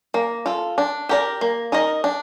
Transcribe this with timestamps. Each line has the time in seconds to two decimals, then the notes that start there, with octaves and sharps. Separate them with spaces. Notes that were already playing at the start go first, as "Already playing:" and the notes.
0.14 A#3
0.46 F4 A4
0.78 D4
1.09 G4 A#4 D5
1.41 A#3
1.72 D#4 A#4 D#5
2.04 D4